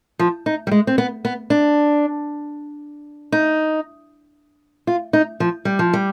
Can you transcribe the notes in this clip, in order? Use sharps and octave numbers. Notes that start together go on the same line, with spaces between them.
F3
D#4
G3
G#3
C4
B3
B3
D4
D#4
F4
D#4
F3
G3
F3
G3